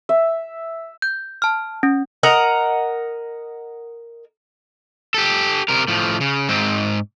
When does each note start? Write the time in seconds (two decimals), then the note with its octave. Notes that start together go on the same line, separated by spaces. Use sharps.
0.09 E5
1.02 G6
1.42 A5 F6
1.83 C#4
2.23 A#4 D#5 F#5 A#5
5.14 G4 A4
5.69 C3 A#4
5.88 A2 F3
6.21 C#3
6.49 G#2 C4